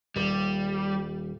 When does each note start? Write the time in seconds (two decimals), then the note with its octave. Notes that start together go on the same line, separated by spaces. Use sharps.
0.16 D#1 G3